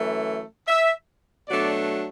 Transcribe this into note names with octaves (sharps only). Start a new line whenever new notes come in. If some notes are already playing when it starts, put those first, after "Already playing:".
Already playing: F#2 E3 A3 E4
E5
B2 F#3 A3 D4 D5